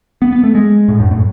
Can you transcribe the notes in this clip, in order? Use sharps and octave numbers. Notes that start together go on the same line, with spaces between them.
B3
B3
A3
G#3
A2
F#2
A2